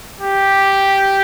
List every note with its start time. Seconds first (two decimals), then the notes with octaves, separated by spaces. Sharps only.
0.21 G4